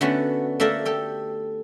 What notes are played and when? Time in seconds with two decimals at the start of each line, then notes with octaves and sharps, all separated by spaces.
0.01 D3 A3 B3 C#4 F#4
0.60 A3 A#3 A4 A#4 D5 E5
0.85 G4 A4 G5